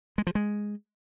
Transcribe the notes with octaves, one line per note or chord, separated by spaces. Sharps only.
G#3
F3
G#3